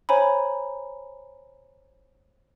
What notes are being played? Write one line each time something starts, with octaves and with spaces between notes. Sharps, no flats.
C5 C#5 G#5 A#5 B5